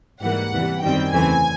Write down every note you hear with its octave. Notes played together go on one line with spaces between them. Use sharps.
G#2 E3 G3 A#3 F#5
E2 C3 E3 G3
F#2 D#3 G3 C4 G5
E2 C#3 E3 A3 C4 G#5